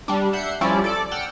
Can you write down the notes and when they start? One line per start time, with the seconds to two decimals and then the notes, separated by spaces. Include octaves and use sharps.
0.08 G3 D4
0.33 E5 F#5 G6 C7 C#7
0.61 F3 G3 C#4 E4 D5
0.84 A4 D5 D6
1.11 F#5 G5 E6 F6